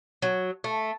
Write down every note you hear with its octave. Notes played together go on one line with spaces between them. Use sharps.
F#3
A3